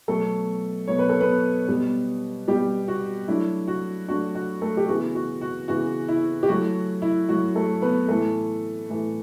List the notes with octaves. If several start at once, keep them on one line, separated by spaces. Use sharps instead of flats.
B2 F#3 A3 B3 A4
B2 F#3 B3 C#5
B4
A4
B3 B4
B2 G3 B3
B2 G3 B3 G4
F#4
F#3 A3 D4 E4
F#4
F#3 A3 D4 F#4
F#4
A3 A4
G4
C#3 E3 B3 F#4
F#4
F#4
C#3 E3 B3 F#4
E4
G4
F#3 A3 E4 F#4
E4
F#3 A3 E4 F#4
A3 A4
B3 B4
A2 E3 A3 A4
A2 E3 A3